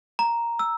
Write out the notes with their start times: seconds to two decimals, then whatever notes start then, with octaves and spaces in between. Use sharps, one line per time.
0.19 A#5
0.59 E6